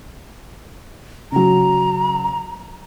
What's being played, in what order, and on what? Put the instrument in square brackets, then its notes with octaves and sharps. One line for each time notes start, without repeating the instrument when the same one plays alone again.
[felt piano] C#3 F#3 [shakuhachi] A#5